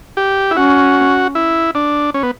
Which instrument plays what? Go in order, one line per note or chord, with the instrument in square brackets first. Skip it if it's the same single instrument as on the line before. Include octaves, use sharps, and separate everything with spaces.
[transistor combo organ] G4
E4
[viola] C#4 [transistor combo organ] F#4
[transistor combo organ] E4
D4
C#4
B3